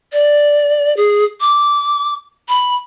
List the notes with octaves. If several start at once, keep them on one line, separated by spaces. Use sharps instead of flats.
D5
G#4
D6
B5